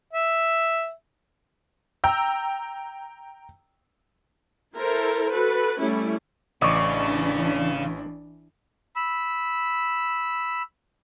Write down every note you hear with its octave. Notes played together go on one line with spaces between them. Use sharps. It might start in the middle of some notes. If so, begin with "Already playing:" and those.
E5
G5 A#5 E6
E4 A4 A#4 C5
F#4 A4 B4
G3 A3 C#4 E4
A1 C#3 E3 D4 D5 D#5 C#6
B5 E6